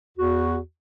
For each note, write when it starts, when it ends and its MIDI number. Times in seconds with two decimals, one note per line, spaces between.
0.18 0.58 40
0.18 0.58 66